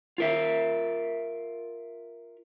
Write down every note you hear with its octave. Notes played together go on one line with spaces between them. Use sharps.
F4 A#4 E5